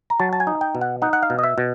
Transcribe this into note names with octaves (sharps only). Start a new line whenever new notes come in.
A#5
F#3 A5
A5
G#5
D#4
G5
B2
F#5
D#4 F#5
F#5
F5
B2
D#5
E5
B2